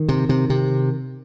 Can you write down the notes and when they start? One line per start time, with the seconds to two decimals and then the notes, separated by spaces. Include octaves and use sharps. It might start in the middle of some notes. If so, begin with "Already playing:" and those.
Already playing: D#3
0.09 C3
0.29 C3
0.50 C3